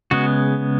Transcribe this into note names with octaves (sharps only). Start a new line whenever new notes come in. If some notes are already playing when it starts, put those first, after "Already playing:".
C#3 G#3 B3 F#4